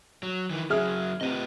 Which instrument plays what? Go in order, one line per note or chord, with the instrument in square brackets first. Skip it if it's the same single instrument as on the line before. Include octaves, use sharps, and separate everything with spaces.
[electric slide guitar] F#3
D#3 E3
[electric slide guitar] C#3 F#3 [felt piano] G#4 E5 F6
[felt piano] C3 [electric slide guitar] F4 B4 D#5